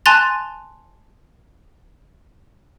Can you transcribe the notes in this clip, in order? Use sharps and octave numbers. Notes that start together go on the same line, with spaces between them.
G#5 A5 C6 F#6 A6 F7